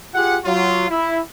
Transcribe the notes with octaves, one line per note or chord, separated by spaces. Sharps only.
F4 G4 G#4 F#5
F#3 F4
E4